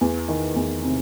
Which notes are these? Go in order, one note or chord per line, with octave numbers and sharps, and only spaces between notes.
E2
D#3
E2
C3